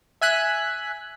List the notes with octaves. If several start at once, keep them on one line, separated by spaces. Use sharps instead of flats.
E5 G#5 F#6 B6